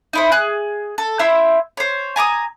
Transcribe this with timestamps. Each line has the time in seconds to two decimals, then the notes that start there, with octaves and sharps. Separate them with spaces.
0.13 D#4 E4 C5
0.32 G#4 F#6
0.98 A4
1.19 E4 C5 E5 E6
1.77 C5 C#5
2.16 G#5 A#5 D6 D#6